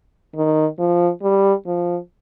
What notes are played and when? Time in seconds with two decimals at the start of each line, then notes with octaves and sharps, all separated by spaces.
0.35 D#3
0.79 F3
1.23 G3
1.66 F3